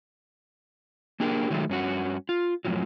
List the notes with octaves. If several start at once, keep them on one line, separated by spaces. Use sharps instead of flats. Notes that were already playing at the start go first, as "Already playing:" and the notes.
A#3 D4 G4 G#4 A#4
D#3 F#3 G#3 A3
G2 C#4 F#4
F4
F#2 A2 C#3 F3 F#3